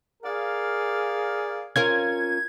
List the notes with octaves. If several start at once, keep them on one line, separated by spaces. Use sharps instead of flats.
G#4 A#4 D5 F5
C#4 F4 A#4 G#6